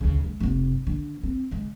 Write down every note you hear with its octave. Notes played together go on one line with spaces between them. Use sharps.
D2 C#3
G#3
F1 C3
D3
C4
C#3 G#3